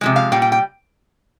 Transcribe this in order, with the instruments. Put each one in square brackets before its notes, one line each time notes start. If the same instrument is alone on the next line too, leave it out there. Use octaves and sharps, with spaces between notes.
[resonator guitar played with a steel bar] C3 F3 G#3
F5
A#2 G3 G5
G5
G5